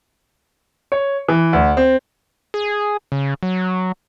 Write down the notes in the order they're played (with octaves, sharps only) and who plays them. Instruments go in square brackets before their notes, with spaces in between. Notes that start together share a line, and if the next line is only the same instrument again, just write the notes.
[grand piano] C#5
E3
D2
C4
[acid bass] G#4
C#3
F#3